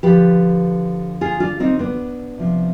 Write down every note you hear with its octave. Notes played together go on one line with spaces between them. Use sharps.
D3 F3 G4 B4
F4 G#4
D4 F4
C4 D#4
B3 D4
C3 F3